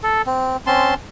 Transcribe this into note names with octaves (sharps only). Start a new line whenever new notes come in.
A4
C4
C4 C#4 A5 C6